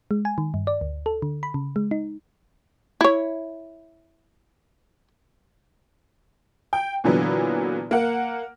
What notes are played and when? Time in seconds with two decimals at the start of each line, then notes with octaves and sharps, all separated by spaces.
0.11 G#3
0.25 G#5
0.38 D#3
0.54 G2
0.67 D5
0.81 D2
1.06 A4
1.22 D3
1.43 B5
1.54 C#3
1.76 G#3
1.91 D#4
3.01 E4 C#5
6.73 G5
7.04 A#2 D3 E3 F#3 B3
7.91 A#3 F#5